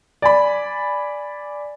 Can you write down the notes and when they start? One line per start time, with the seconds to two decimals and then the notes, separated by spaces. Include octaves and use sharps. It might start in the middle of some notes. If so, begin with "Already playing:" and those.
0.22 D5 G#5 B5